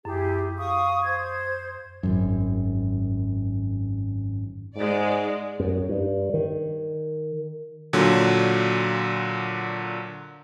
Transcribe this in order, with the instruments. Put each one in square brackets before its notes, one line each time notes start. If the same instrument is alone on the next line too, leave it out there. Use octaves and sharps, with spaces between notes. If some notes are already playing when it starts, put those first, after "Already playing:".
[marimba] F#2 [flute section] E4 G4 G#4
[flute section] F5 C#6 D#6
C5 G#6
[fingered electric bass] G#1 F#2
[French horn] G#2 [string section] G#3 D5
[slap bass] F#2
G2
D#3
[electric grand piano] A#2 D3 F#3